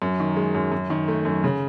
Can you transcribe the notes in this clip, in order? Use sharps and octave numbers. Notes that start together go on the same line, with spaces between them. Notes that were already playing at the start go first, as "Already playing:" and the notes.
F#2
D#3
G#3
F#2
F#2
D#3
A3
F#2
C#3